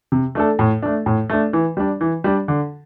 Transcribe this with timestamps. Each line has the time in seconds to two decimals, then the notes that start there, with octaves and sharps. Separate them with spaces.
0.12 C3
0.35 A3 D4 A4
0.59 A2
0.82 A3 D4
1.06 A2
1.30 A3 D4
1.53 E3
1.77 G3 D4
2.01 E3
2.24 G3 D4
2.48 D3